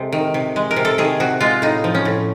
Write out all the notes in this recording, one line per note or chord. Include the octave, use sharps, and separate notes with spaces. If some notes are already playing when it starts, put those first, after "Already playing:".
Already playing: C3 G#3 A4
D#3
C3
G#3
A#4
C3
A4
D#3 G#4
C3 F#4
G#3 F4
A2 D#4
F3
C#4
A2